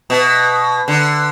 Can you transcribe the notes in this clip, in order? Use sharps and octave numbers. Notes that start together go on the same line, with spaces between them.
B2
D3